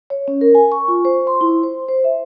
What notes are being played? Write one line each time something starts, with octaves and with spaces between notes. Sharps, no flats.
C#5
C#4
A#4
G#5
C#6
F4
C5
C6
E4
C5
C5
E5